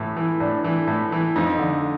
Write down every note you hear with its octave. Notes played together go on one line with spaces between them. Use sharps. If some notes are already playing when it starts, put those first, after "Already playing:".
Already playing: A2 E3
E3
A2 D4
E3
A2
E3
F2 D#4
D3